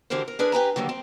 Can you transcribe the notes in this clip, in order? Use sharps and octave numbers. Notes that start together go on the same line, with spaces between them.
D2 D3 E3 G4 A#4 C5
A#4
D4 E4 G#4 A#4 B4
G4 B4 G#5 A#5
D#2 D3 F#3 G3 A#3
C4